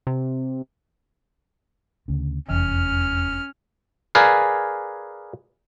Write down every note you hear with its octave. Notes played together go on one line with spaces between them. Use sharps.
C3
D2 C#3
F1 E2 C#4 F6
G#4 A#4 B4 D5 F5 G#5